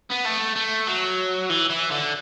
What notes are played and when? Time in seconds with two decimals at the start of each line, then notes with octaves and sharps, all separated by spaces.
0.10 B3
0.25 A3
0.56 A3
0.87 F#3
1.50 E3
1.70 E3
1.91 D3